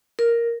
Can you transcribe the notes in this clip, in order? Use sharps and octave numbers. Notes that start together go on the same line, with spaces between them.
A#4